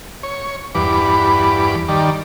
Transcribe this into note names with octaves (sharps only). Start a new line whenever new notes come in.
C#5
E2 G2 B4 D6
D#3 G3 D5